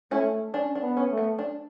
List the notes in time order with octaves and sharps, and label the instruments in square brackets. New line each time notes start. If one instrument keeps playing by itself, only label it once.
[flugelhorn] A3 [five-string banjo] C#4 E4
[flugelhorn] C#4 [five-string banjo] D4
[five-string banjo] D4
[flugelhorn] B3
[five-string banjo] C#4
[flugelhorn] A3
[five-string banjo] B3
D4